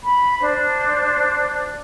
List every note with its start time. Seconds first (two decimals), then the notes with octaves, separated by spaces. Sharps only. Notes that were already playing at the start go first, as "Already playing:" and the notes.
0.03 B5
0.40 D4 C5